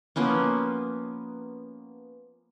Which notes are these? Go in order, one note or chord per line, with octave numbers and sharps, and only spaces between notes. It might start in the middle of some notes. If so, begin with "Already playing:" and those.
F3 A#3 B3 C#4